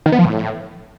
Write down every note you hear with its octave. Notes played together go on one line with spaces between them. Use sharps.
D#3
B3
F3
A2